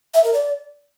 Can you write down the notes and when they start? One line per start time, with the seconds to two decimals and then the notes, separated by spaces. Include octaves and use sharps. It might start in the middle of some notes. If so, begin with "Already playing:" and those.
0.14 E5
0.24 A#4
0.34 D5